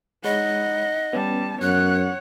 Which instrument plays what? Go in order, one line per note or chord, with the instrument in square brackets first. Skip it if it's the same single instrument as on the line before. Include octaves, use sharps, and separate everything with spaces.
[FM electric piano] G#3 C#5 B5 [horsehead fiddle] D#4 F#5 [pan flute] D#5
[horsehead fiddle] G3 A5 [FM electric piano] B3 C#4
[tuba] F#2 [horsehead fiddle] C#5 F#5 [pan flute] F#6